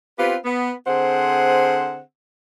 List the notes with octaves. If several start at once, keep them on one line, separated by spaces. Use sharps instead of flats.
B3 C4 F4 G4 B4
B3
D3 C4 G#4 C5 F#5